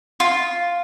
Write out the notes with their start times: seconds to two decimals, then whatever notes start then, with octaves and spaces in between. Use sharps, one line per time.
0.20 F4